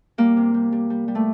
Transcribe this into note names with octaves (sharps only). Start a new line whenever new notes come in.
G3 A#3
C3
G3
G3
G3
G3
A3